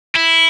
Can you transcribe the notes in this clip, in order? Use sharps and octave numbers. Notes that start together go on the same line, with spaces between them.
E4